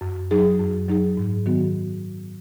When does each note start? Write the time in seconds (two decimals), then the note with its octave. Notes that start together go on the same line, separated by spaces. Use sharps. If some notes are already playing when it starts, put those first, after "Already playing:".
0.01 F#2
0.31 F#3 D#4 G#4
0.60 F#2
0.88 F#3 D#4 G#4
1.17 G#2
1.46 D#3 F#3 B3 F#4